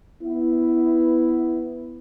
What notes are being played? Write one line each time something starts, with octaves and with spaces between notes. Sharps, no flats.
B3 E4